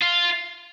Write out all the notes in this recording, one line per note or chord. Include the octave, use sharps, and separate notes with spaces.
F4